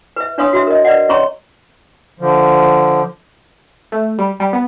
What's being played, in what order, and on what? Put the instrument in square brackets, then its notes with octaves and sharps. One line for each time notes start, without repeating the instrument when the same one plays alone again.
[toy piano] B4 E5
D4 B4 C#5 F5 C6 D#6
F#4 E5
A#4 D#5
B4 D5 D#5 F#5
C#4 C#5 E5 A#5 C6 C#6
[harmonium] D3 F3
[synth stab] A3
G3
G3
B3